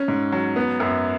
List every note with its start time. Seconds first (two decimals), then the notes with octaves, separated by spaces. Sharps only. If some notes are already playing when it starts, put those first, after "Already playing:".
Already playing: C#4
0.08 G#2
0.32 F#3
0.56 B3
0.80 F#2